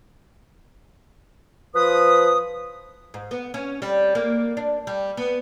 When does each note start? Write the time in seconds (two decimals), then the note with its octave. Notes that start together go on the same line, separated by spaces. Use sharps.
1.75 F3 B4 D#6
3.14 G#2
3.31 B3
3.54 C#4
3.82 G3
4.15 A#3
4.57 D4
4.87 G3
5.17 B3